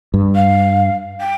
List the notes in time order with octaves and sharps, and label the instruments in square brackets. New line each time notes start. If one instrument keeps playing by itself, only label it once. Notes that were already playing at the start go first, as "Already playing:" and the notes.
[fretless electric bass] G2
[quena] F5
G5